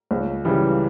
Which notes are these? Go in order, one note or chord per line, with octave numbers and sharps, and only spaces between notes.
C#2
C#3 E3 G3